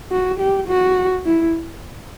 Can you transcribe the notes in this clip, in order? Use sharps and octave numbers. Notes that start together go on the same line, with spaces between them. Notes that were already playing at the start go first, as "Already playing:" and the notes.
F#4
G4
F#4
E4